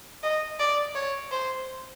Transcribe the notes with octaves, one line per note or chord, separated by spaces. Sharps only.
D#5
D5
C#5
C5